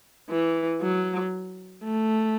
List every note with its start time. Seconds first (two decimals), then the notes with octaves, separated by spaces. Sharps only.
0.30 E3
0.81 F#3
1.84 A3